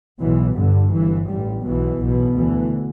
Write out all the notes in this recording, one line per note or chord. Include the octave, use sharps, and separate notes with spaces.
B1 B2 E3
G1 G2 D3
G1 G2 E3
A1 G2 G3
B1 B2 E3
B1 B2
D2 E3